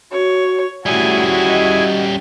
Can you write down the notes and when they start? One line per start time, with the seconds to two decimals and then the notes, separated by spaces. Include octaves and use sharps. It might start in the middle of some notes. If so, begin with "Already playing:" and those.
0.12 F#4 C#5
0.86 G3 A3 C#4 E4 F#4 G#4 G#5
1.46 D#5